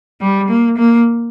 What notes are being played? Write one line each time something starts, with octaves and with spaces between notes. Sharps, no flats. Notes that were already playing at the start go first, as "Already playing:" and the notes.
G3
A#3
A#3